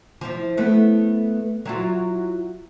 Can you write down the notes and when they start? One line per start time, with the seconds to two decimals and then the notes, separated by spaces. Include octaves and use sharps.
0.21 F3 E4
0.57 A3 B3 E4
1.65 F#3 E4 F4